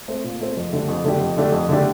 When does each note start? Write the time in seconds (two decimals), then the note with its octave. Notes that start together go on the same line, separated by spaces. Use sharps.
0.08 A3 C4
0.24 A#2
0.41 A3 C4
0.57 F2
0.72 D3 A3 D4 G4
0.88 F2
1.04 D3 A3 D4 G4
1.21 F2
1.37 D3 A3 D4 G4
1.52 F2
1.68 D3 A3 D4 G4